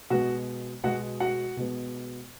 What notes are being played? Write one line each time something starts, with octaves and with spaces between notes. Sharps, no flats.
B2 G#3 B3 F#4 F#5
B2 G#3 B3 F#4 F#5
F#4 F#5
B2 G#3 B3